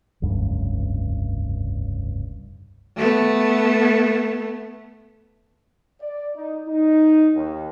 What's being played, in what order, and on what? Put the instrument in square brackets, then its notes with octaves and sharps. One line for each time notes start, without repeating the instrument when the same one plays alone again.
[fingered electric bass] F1 C#2 G2
[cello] A3 B3
[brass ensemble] D5
D#4
D#4
D#2